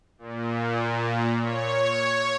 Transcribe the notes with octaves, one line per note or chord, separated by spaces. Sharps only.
A#2
C#5